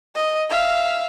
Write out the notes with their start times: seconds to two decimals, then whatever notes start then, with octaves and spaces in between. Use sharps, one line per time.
0.15 D#5
0.50 E5 F5